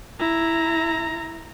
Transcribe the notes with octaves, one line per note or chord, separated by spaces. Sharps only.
E4 A#5